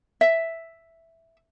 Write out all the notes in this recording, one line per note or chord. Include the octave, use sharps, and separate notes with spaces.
E5